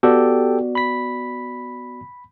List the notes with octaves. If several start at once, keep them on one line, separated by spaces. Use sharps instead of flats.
B3 F#4 G4 A4 D5 G5
B5 B6